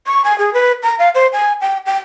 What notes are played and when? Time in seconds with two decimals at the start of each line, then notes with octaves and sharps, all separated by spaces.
0.06 C#6
0.24 G#5
0.38 G#4
0.53 B4
0.82 A#5
0.98 F5
1.14 C5
1.32 G#5
1.61 G5
1.85 G5